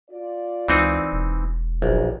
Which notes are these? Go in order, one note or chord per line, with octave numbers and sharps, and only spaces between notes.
F4 D5
C#2 E3 C4 D#4
E1
A#1 D#3 E3 F#3